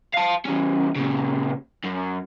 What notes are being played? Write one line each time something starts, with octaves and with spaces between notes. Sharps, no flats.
F5 A5
E2 C#4
A#2 C#3
F#2